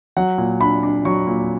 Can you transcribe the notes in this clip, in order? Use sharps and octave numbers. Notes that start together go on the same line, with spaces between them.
F#3 F#5
A#2
D4 B5
D4
F#3 C#6
A#2